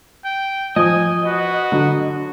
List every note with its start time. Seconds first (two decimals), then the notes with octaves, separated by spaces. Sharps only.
0.24 G5
0.76 F3 D#5 G#5 D#6
1.25 F#4 B4
1.72 D3 F#3